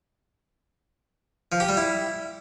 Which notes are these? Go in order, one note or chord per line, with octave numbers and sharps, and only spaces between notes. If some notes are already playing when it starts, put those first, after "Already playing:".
F3
G4
G3
E4